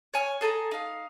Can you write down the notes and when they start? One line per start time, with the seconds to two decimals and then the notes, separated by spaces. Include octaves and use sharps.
0.14 C#5 G#5 F6
0.41 G#4 A4 G#5 A#5
0.71 D#4 F5